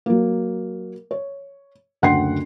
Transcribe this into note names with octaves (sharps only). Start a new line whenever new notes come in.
F#3 A#3
C#5
F#1 D2 F#5 G5 C6 C7